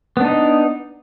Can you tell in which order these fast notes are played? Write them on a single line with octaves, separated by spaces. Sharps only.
B3 D4 D#4